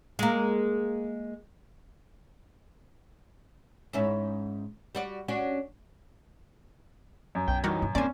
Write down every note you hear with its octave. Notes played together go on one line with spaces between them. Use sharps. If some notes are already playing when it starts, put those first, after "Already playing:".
G#3 A#3
G#2 C#4 E4
G3 F#4 D5
C#4 D4 F#4
F#2
B1 G5
E3 F#3 G3 D#4 F#4 A#4
G2
D#1 D3 A#3 C4 C#4 C5 D5 G#5